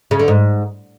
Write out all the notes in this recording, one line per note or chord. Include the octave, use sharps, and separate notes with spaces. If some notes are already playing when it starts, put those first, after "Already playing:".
C#3
D3
G#2